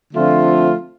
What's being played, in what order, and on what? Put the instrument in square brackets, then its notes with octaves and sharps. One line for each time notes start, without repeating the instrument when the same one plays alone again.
[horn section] D3 F3 A3 C4 F4